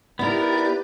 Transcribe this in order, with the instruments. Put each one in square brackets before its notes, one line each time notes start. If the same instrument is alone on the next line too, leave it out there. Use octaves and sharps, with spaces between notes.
[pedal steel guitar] B3 A#4 [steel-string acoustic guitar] D#4 E4 [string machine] G4 B4 [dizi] D5